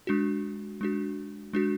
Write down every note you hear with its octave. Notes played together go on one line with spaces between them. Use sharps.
G#3 D4 F#4
G#3 D4 F#4
G#3 D4 F#4